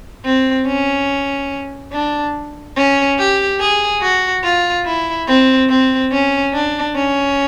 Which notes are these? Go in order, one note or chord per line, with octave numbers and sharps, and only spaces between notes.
C4
C#4
D4
C#4
G4
G#4
F#4
F4
E4
C4
C4
C#4
D4
C#4